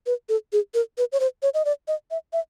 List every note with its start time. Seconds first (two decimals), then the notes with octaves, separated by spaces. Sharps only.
0.06 B4
0.29 A4
0.53 G#4
0.74 A#4
0.98 B4
1.12 C#5
1.20 C5
1.42 C#5
1.54 D#5
1.65 D5
1.88 D#5
2.11 E5
2.33 E5